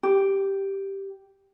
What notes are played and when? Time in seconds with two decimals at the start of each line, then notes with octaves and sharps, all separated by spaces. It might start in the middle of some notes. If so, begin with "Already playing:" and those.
0.03 G4